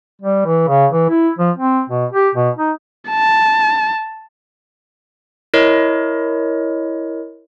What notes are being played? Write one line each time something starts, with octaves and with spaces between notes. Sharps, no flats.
G3
E3
C#3
E3
E4
F3
C4
B2
G4
B2
D#4
A5
E4 A#4 C#5 D#5